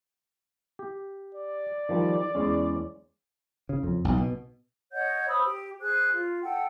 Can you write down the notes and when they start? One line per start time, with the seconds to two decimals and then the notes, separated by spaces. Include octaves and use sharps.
0.79 G4
1.35 D5
1.89 D#3 F3 G3
2.35 E2 G#3 C#4
3.69 C#3
3.83 F2
4.05 B1
4.17 B2
4.92 C#5 D#5 F#5 G6
5.28 C5 B5 D#6 E6
5.44 G4
5.80 G#4 C5 F#6
6.13 F4
6.42 A4 F#5 G5